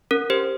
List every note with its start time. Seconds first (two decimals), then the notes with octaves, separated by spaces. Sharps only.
0.11 C#4 A#4
0.30 G4 C5